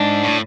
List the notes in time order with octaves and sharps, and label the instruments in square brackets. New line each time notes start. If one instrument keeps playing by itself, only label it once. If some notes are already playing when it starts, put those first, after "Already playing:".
Already playing: [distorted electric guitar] G#2 [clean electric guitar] D4
[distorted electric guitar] A2